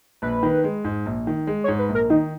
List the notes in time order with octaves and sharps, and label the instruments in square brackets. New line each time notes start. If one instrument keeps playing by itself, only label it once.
[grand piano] A#1 [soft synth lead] B4
[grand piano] D#3
G#3
G#2
A#1
D#3
G#3
[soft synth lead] C#5
[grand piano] G#2
[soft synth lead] B4
[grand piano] A#1
[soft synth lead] A#4
[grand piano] D#3 [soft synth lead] D#4